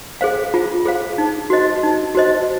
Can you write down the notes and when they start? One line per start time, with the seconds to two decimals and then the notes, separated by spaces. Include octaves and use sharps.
0.21 G#4 C5 F5
0.54 F4
0.85 G#4 C5 F5
1.18 D#4
1.50 F#4 C5 D#5
1.83 D#4
2.15 F#4 C5 D#5